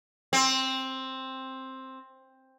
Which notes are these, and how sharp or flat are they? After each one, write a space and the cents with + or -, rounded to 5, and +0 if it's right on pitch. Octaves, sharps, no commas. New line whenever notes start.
C4 +10